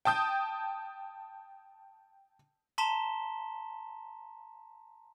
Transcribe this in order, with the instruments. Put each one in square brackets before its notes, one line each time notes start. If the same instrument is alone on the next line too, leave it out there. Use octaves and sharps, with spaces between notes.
[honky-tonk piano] G5 A5 D#6 G6
[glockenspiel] A5 A#5 C6 B6 E7 G7